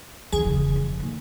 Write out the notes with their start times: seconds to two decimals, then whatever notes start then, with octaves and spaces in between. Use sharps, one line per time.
0.32 F2 D#3 G#4
0.44 E1 C#3
0.76 F2
1.00 A#2 D#3